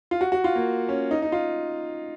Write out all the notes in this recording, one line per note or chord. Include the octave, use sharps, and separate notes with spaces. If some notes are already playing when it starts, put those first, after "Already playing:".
F4
F#4
F#4
F4
A#3
C#4
D#4
D#4
F4